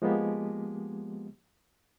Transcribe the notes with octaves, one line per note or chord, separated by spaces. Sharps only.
F3 G#3 A#3 B3 G4